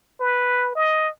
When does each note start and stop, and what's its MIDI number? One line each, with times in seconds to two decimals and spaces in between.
0.20 0.75 71
0.75 1.09 75